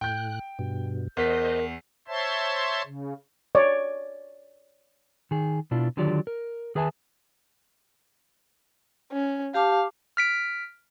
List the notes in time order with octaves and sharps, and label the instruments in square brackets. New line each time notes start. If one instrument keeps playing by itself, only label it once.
[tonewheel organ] A2 F#6 [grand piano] G5 G6
[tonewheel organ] G2 B2
[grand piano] E2 B6 [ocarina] A#4 [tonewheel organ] C5 D#5
[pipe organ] C5 C#5 E5 A5 C6
C#3
[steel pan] C#5 D5
[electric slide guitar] D#3 G#4
B2 D4 E4 F4
D3 D#3 F#3 F4 G4 D5
A#4
D#3 G#4 B4 E5 G#5 A5
[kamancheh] C#4
[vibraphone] G4 A5 D6 [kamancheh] F5
[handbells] F6 B6 D7